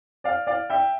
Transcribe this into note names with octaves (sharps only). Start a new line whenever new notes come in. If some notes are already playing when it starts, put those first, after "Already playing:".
D5 F5
D5 F5
E5 G5